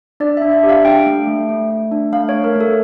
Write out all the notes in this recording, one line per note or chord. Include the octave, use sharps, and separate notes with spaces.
D4 D5
E5
D4
E5
G4
F5
D4 G5
A3
A3
A3
A3
D4
A3 F5
C#5
A3
A#4
A3 A4